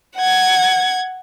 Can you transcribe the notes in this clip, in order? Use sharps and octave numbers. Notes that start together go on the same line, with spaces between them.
F#5 G#6